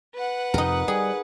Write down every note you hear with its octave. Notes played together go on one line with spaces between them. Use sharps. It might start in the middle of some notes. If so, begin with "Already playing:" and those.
B4 F#5
F2 C3 D#4 A#4
G3 G#4